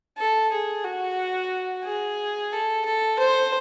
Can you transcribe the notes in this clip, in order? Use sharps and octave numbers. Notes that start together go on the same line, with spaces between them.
A4
G#4
F#4
G#4
A4
A4
C5